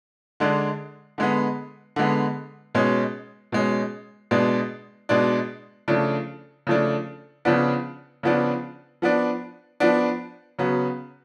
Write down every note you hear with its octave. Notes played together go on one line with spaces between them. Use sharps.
D3 G#3 D4
D3 G#3 B3
D3 G#3 B3
B2 G#3 C#4
B2 G#3 C#4
B2 G#3 D4
B2 G#3 D4
C#3 F3 A3 D4
C#3 F3 A3 D4
C#3 F3 B3 D4
C#3 F3 B3 D4
F3 B3 D4
F3 B3 D4
C#3 F#3 B3